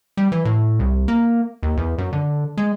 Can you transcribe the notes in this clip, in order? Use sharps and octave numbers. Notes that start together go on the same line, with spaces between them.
G3
E3
A2
C2
A#3
D#2
E2
F#2
D3
G#3